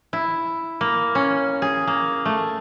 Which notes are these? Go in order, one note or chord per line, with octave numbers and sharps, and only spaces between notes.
E4
A#3
C#4
G#4
A#3
A3